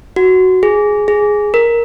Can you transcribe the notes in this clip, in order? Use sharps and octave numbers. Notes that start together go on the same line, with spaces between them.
F#4
G#4
G#4
A#4